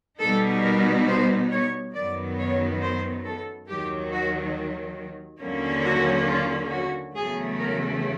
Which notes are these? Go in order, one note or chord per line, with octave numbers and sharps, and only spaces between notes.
B2 G3 B3 D#4 A4
A#4
C5
C#5
F#2 D#3 F#3 B3 D5
C#5
C5
A4
D#2 D#3 F#3 G4
F#4
D#2 D3 F#3 A#3 C#4
F#4
F4
F#4
E2 C#3 F#3 A3 G#4
A#4